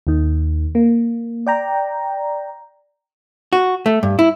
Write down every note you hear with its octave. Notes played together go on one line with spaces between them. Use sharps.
D#2 D#3
A#3
D5 G5 A#5
F#4
A3
G2
E4